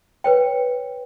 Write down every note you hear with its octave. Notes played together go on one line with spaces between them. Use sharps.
B4 C#5 G5